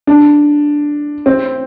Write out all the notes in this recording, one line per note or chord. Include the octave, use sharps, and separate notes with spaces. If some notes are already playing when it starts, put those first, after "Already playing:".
D4
C4